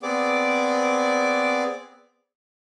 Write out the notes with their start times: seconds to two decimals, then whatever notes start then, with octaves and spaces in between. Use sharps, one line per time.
0.03 B3 C4 G#4 D5 D6